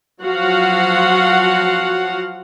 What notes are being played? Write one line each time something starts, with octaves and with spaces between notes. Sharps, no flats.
F3 F#3 F#4 F5 F#5